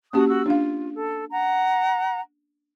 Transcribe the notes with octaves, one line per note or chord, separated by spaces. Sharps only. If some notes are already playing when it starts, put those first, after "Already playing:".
A#3 C#4 F#4 G4 A5 D#6
F#4 E6
D4 F4 F5
A4
F#5 A#5